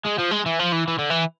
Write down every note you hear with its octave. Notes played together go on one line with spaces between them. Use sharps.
G#3
F3
G#3
E3
F3
E3
E3
D3
E3